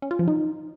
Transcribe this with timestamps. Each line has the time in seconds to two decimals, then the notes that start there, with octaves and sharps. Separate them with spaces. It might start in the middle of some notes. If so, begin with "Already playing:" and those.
0.02 C#4
0.11 F4
0.19 F3
0.28 D#4